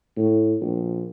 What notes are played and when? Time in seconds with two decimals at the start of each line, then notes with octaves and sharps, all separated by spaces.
0.17 A2
0.62 A#1